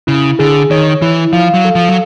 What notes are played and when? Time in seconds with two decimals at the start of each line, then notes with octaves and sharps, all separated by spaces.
0.07 C#3 E4
0.39 D3 G#4
0.71 D#3 C#5
1.02 E3 E4
1.33 F3 F5
1.54 F#3
1.65 A4
1.75 F3
1.89 F#3